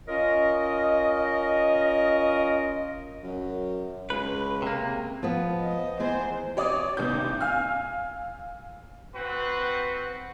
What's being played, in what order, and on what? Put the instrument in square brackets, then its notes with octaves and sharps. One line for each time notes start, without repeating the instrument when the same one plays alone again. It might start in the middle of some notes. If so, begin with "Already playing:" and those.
[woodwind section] C#4 F4 A#4 C#5 D#5
[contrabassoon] F#2
[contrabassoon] C#2 [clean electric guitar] B4
[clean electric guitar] C3 A#3
[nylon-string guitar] F3 B3
[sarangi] D#5
[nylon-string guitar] E2 G#5 [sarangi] C5
[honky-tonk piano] C#5 D5 D6 D#6
A1 D#2 C3 B3 G6
F5 G#5 E6 F6
[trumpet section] C4 F#4 B4 F#5